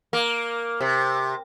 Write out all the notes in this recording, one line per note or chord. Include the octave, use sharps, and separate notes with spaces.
A#3
C3